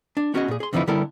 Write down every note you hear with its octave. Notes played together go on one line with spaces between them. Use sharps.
D4
B3 C#4 F#4 G#4 D5 D#5
A#2 G#4
G#4 C6
F2 D3 E3 F3 D#4 E4
D3 G3 B3 E4 A4 A#4